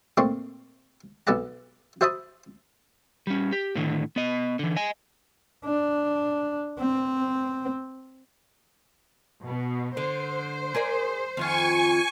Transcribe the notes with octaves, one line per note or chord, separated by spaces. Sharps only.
A#2 A3 C4 C6 C#6
B1 B3 A4 D5 F#5 A#5
F#4 C5 E5 A5 B5 D#6
G3 C#4
G4
A2 D3 D#3
B3 D#5
D3 E3
D#5 G#5
D4
C4
B2
D3 C5
G#4 A#4 D5
F2 D#3 F4 G#5 C#6